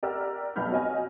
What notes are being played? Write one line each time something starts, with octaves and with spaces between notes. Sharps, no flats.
G4 A#4 D5 F#5 E6 F6
B1 B3 B5 F6 G6
F#4 C#5 D#5 G#5 F6